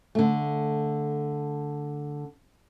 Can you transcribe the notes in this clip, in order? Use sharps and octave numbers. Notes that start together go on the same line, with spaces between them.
D3 A3